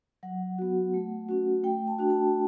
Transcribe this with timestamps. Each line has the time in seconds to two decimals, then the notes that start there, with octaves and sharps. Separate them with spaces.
0.23 F#3 F#5
0.58 B3 F#4
0.94 A3
1.29 C#4 F#4
1.64 A3 G5
1.87 A5
1.99 D4 F#4
2.10 A5